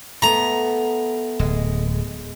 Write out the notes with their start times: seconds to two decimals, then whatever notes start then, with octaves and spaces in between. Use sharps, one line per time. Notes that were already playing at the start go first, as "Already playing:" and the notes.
0.22 A3 B3 A#5
1.39 D1 G#3